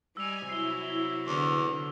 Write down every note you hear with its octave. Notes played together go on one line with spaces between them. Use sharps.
G3 D#5 G#5 E6 F7
C3 F#3 E4 C7 G7
E2 D3